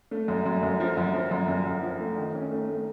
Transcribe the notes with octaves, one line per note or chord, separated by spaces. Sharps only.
A3
F#2
F#2
F#2
F3
F#2
F3
F#2
F#2
F#2
F3
A3
D#3
C#4
A3
A3